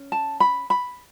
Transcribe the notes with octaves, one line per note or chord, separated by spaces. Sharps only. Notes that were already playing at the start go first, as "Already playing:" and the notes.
Already playing: C#4
A5
B5
B5